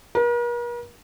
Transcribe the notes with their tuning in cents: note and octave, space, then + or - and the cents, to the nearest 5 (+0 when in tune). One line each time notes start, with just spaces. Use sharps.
A#4 +45